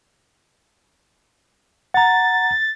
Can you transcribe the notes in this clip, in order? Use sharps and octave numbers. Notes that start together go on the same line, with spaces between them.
F#5 A#5 A6